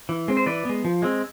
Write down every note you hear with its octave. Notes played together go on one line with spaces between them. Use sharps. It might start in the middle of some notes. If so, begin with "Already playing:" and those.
E3
G#3 C4
C5
E3 B4 D5
G#3 B3
F3
G#3 C4